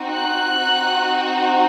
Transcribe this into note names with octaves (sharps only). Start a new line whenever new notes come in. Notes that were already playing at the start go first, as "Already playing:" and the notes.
Already playing: C4 D#4 F#4
F#6
C4 D#4 F#4